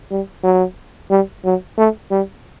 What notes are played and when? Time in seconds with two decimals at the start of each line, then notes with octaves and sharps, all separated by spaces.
0.11 G3
0.43 F#3
1.11 G3
1.45 F#3
1.78 A3
2.11 G3